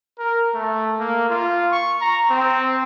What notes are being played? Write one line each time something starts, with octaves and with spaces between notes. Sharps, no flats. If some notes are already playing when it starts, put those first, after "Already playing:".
A#4
A3
A#3
F4
C#6
A#5
C4